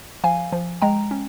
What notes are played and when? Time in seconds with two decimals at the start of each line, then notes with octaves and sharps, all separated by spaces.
0.24 F3 F5 G#5
0.52 F3
0.82 G#3 G5 A#5
1.11 C#4